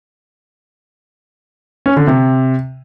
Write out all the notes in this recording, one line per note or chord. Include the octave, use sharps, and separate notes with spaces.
C#4
D3
C3